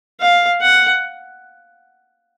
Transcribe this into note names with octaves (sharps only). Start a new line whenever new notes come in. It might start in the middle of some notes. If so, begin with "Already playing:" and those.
F5
F#5